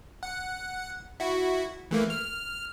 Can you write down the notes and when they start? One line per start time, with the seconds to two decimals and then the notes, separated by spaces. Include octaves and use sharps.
0.23 F#5
1.20 E4 F#4
1.91 E3 A3 A#3
2.10 F6